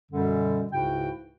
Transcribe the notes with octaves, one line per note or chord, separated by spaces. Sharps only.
F#2 B2 D3 G3
C#2 G#2 C#3 E4 F#4 G5